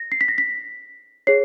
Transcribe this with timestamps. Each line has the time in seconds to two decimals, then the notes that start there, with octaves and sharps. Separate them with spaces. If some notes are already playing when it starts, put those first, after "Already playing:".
Already playing: A#6
0.12 C7
0.21 B6
0.28 A#6
0.38 B6
1.27 G#4 C#5 C7